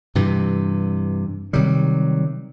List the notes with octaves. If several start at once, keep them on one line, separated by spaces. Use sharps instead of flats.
G2 C3 E3
C3 D#3 F#3 G3